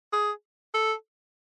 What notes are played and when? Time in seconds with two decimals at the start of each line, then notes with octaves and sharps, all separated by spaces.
0.13 G#4
0.74 A4